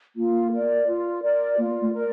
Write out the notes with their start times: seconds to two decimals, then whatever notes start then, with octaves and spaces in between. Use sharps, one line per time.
0.16 A#3 F4
0.52 A#4 D5
0.87 F4
1.23 A#4 D5
1.58 A#3 F4
1.81 A3
1.93 A#4 D5